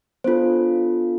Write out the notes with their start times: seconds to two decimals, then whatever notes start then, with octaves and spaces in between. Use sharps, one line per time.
0.24 B3 D4 F4 A4 C5